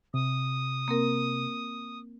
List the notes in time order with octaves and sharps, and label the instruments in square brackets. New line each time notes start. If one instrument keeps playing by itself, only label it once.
[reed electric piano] C3 [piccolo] D#6
[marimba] A#3 C4 A#4